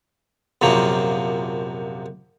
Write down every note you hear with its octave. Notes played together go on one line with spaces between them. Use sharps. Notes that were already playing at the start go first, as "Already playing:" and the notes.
A#1 F#2 C3 F3 A#3